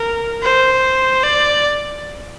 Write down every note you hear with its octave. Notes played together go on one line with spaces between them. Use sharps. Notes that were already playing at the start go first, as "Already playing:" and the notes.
Already playing: A#4
C5
D5